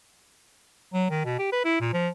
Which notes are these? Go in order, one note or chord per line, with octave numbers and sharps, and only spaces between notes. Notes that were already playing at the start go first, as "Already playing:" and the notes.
F#3
D#3
B2
G4
B4
E4
A#2
F3